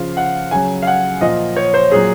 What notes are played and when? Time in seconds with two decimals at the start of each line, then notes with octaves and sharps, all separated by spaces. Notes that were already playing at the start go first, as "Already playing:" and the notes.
Already playing: C#3 F3 F5
0.17 F#5
0.51 C#3 F#3 G#5
0.82 F5
0.87 F#5
1.21 A#2 F3 D#5
1.56 C#5
1.74 C5
1.92 A#2 F#3 G#4